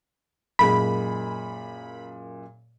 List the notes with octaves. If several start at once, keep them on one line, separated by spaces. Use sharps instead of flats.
F#2 A#2 G#3 B5